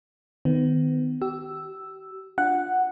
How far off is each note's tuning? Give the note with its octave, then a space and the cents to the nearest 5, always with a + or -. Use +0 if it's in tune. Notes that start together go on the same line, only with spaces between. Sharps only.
D#3 +0 B3 +35
G4 -35 E6 +0
D4 +0 F4 +10 F#5 +0